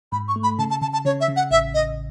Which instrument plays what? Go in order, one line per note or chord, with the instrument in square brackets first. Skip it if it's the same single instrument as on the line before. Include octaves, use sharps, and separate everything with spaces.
[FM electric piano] G#2 [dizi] B5
[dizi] C#6
[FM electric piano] A3
[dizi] B5
[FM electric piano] C#3 [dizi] A5
[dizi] A5
[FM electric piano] C#3 [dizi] A5
[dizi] A5
[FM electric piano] C#3 [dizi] C#5
[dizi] E5
[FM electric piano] C#3
[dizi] F#5
[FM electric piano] A1 [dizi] E5
[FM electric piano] A1 [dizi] D#5